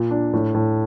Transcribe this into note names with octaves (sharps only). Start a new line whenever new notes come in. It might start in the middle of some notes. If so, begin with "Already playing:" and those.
Already playing: A#2
D4
A2
A2